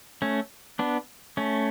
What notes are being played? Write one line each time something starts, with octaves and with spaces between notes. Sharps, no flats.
A3 C#4
B3 D4
A3 C#4